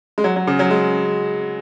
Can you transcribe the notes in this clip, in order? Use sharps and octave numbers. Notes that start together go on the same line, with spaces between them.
G#3
F#3
F#3
C#3
F#3
G#3